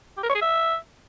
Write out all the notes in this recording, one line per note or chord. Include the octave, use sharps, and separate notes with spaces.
G4
A#4
C#5
G#4
E5